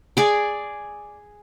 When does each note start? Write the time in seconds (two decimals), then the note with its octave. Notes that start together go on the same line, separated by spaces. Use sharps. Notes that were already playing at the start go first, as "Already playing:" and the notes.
0.17 G#4 D5